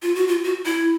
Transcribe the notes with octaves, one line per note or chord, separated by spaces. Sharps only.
F4
F#4
F4
F#4
E4